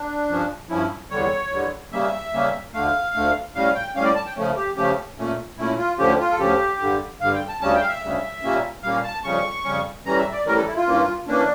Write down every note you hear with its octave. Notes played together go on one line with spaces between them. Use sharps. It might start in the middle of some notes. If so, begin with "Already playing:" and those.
Already playing: D4
G2 F3 C#4
G2 F3 C#4 E4
E2 D3 G3 C#5
E2 D3 G3
C#3 G3 A#3 C#4 E5
C#3 G3 A#3 C#4
D2 D3 A3 F5
D2 D3 A3
A2 G3 C#4 F5
G5
A2 G3 C#4 F5
D5
A5
G5
C#3 F3 A3 C#4
G4
C#3 F3 A3 C#4 G4
A#2 A3 C#4
A#2 A3 C#4 E4
F4
D2 D3 F3 C#4 G4
F4
A4
D2 D3 F3 C#4 G4
G2 D3 G3
G2 D3 G3 F5
G5
A5
D2 C#3 G3 C#4 A5
G5
F5
E5
D2 C#3 G3 C#4
A#2 G3 A#3 C#4
A#2 G3 A#3 C#4 F5
A5
F2 C#3 G3 C#4 C#6
F2 C#3 G3 C#4
A2 E3 G3 C#4 A#5
E5
D5
A2 E3 G3 C#4 A#4
A4
E4
F4
G2 E3 A#3 C#4
E3 A#3 C#4 D4